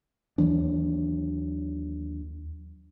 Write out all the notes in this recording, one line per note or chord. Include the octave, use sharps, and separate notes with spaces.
D#2 E3 F#3 D4